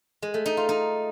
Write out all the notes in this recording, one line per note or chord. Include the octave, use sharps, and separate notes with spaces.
G#3
A3
D#4
F4
D#4